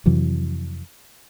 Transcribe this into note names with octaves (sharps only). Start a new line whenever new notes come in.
F2 C3 E3 F#3